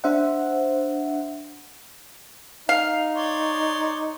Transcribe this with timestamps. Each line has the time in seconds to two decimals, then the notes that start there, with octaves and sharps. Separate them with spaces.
0.04 D4 C5 E5 F#5
2.69 D#4 F5
3.15 C#5 D5 C6